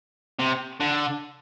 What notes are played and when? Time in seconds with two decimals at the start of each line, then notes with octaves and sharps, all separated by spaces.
0.39 C3
0.80 D3